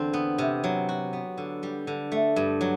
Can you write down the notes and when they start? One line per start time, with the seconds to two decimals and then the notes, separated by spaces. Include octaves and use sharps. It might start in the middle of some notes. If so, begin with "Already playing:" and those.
Already playing: E2 D3 C4
0.13 B3
0.38 C3
0.64 F#3
0.89 F#4
1.13 B3
1.38 D3
1.63 G3
1.87 D3
2.12 A3
2.36 G2
2.61 F#3